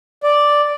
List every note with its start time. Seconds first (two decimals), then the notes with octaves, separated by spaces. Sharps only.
0.23 D5